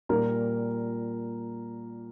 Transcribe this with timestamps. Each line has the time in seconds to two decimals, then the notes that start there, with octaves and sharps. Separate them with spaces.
0.09 A#2 G3 A#4 A#5